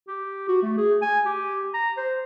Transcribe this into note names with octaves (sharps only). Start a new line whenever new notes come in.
G4
F#4
A3
G#4
G#5
G4
A#5
C5